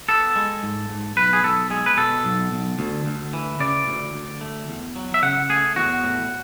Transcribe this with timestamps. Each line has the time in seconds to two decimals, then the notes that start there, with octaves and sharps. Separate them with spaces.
0.08 B3 A4
0.36 G#3
0.63 G#2
0.90 G#2
1.16 B1 B4
1.33 G#4
1.44 B1 A4
1.70 G#3 G#4
1.86 B4
1.97 B2 A4
2.25 B1
2.52 B1
2.79 D2
3.06 D2
3.33 E3
3.60 C#3 D5
3.87 D2
4.14 D2
4.41 A3
4.68 E2
4.96 F#3
5.14 E5
5.23 C#3 F#5
5.49 A3 G#4
5.76 E2 F#4
6.04 A2